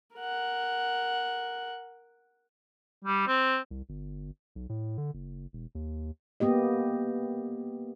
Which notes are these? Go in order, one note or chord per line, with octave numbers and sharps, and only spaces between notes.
A#4 F#5
G3
C4
C2
G1
B1
A2
D3
F#1
E1
D#2
A#3 B3 G4 D#5